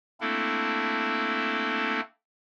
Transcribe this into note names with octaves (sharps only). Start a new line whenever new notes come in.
A3 A#3 C4 D4 E4 A4